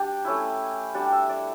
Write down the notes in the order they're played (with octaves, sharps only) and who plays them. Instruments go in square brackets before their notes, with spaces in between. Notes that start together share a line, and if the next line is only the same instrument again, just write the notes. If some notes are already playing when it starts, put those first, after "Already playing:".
Already playing: [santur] G3 D4 G4
A3 C#4 E4
G3 D4 F#5
E5
D5